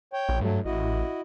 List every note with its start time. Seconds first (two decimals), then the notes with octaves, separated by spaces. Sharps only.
0.13 C#5 G5
0.29 A#1
0.41 G2 F#3 A3
0.65 A1 E4 F#4 D#5